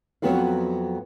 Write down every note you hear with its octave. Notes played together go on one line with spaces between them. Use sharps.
F2 F#3 B3 F#4 B4 F5